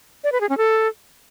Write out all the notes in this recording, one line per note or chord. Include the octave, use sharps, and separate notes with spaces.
D5
B4
G#4
C#4
A4